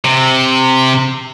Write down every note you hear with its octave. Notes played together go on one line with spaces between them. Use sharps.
C3